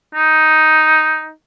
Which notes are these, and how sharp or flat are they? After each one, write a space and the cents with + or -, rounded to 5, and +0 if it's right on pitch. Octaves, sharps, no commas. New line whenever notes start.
D#4 +5